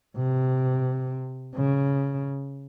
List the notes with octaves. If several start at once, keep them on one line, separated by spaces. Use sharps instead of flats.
C3
C#3